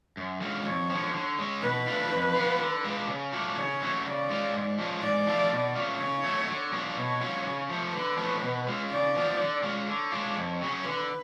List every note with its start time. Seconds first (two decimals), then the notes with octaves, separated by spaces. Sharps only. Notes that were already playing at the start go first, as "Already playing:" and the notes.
0.17 F#2
0.41 D3 G#3 C#4 F4
0.66 F2 C#5
0.90 D3 F3
1.14 D3
1.39 G#3 C#4
1.62 B2 B4
1.87 A3 D4 F4
2.12 F2
2.35 F3 B3 F4
2.60 D3
2.84 G#3 D4 F4
3.08 C#3
3.33 F#3 A3 D4 F4
3.57 C#3 C#5
3.81 F#3 A3 C#4
4.06 C#3 D5
4.30 G#3 C#4 F4
4.54 G#2
4.78 F3 G#3 C#4 F4
5.02 G#2 D5
5.27 F3 A3 F4
5.51 B2
5.75 A3 C#4 F4
5.99 C#3 C#5
6.24 F#3 A3
6.48 D3
6.72 F#3 B3 D4 F4
6.97 B2 C#5
7.21 F#3 C#4 F4
7.45 C#3
7.69 F3 A3
7.94 D3 B4
8.18 F3 A3 C#4
8.42 B2
8.67 G#3 C#4 F4
8.91 C#3 D5
9.15 F3 B3 F4
9.39 D3
9.63 G#3 C#4 F4
9.88 D3 C#5
10.12 G#3 D4 F4
10.36 F2
10.61 C#3 F#3 C#4
10.85 D3 B4